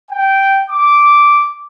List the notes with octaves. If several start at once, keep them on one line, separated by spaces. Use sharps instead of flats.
G5
D6